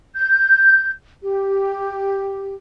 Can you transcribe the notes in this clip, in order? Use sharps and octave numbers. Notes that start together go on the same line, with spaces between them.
G6
G4